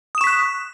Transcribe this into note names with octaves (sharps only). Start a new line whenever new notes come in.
C#6 D#6 F#6 B6 E7